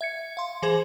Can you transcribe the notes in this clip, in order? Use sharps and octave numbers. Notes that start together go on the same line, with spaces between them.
E5 G#6 C#7
F5 C6
E3 G#4 C5 G#6